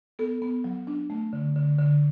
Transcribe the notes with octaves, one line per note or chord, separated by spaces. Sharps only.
B3 A4
B3
F#3
D4
A3
D3
D3
D3